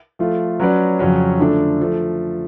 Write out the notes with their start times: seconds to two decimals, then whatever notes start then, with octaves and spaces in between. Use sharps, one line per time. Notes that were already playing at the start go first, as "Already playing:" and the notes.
0.19 F3 A3 F4
0.60 F#3 C#4 F#4 B4 D5
0.99 F2 C#3 F#3 C#4 F#4
1.39 D3 F3 A3 D4
1.81 F3 A3